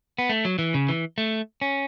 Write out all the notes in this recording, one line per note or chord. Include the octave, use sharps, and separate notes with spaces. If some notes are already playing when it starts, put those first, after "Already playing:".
B3
A3
F#3
E3
C#3
E3
A3
C#4